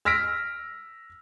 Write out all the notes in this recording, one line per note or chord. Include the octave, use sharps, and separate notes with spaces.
E6 F6 A#6 B6 D7